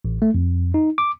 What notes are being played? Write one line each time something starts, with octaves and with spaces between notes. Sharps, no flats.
A1
A3
F2
D#4
D6